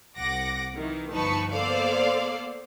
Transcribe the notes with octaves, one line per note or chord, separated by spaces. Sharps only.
C2 F#5 D6 A#6
D#3 E3
G1 F3 D#4 B4 A5 C#6
A#3 B3 A4 C5 D5 F5